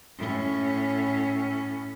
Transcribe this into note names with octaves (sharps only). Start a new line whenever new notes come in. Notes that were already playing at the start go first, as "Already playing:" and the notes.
A2 C#4